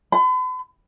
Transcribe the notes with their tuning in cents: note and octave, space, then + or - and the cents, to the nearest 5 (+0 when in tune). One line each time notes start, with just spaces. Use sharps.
B5 +45